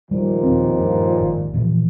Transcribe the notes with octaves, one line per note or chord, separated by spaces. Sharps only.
D#2 A#2 F3 G3
D#1 C4
G2
G#1
A#2 E3 F3